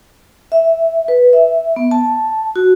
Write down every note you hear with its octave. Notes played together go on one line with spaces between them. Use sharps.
E5
B4
E5
B3
A5
F#4